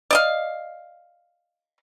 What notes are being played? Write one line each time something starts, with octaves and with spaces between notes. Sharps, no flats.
D5 D#5 F5